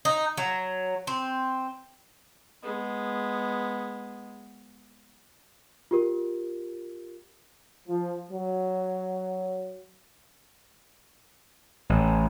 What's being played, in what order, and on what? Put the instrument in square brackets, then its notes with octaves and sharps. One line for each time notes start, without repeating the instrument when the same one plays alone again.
[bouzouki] D#4
F#3
C4
[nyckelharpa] G#3 B3
[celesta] F4 G4 A#4
[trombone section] F3
F#3
[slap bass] A1